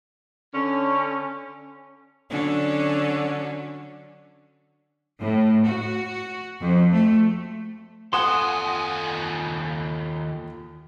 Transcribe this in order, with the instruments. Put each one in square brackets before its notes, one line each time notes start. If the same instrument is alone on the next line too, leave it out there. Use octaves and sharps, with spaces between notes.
[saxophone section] D3 C#4
[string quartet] D3 F#3 C#4 D4
[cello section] A2
F#4
F2
A3
[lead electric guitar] D#2 G#5 [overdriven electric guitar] F4 A4 [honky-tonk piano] F#5 D#6 E7 [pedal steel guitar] C6